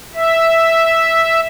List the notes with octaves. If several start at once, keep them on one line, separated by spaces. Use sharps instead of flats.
E5